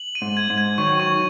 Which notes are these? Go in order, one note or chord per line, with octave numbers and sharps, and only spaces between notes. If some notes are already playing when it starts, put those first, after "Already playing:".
Already playing: F#7
D#7
G#2
G#6
G#2
G#6
D#3 F#3 C#6
C#6